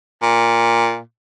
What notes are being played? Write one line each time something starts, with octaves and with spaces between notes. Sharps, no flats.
A#2